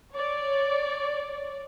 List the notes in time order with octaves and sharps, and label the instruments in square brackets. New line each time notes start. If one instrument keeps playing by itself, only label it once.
[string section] C#5 D5